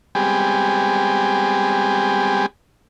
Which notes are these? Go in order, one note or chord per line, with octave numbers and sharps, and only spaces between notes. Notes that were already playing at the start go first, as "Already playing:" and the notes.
G3 G#3 B3 C4 G4 G#4